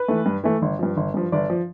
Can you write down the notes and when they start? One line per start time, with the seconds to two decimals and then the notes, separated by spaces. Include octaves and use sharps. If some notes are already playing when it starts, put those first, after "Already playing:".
Already playing: B4
0.08 E3 A3
0.26 G2
0.44 E3 A3
0.62 G1
0.79 G2 F3
0.97 G1
1.14 G2 F3
1.32 G1 D5
1.50 F3